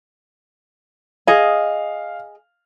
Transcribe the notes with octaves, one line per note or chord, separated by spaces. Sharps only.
G#4 D#5 F5